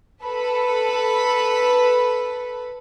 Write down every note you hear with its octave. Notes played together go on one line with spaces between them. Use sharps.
A4 B4 B5